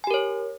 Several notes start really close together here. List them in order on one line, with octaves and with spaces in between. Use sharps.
G#5 G4 A#4 C#5